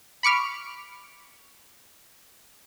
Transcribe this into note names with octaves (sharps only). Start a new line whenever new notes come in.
B5 C#6 D6 F6